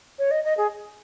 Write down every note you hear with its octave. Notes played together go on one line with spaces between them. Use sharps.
C#5
D#5
D#5
G#4